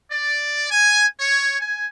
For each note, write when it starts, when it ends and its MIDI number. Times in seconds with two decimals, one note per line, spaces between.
0.11 0.71 74
0.71 1.04 80
1.20 1.55 73
1.59 1.85 80